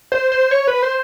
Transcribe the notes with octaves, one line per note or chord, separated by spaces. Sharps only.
C5
C5
C#5
B4
C5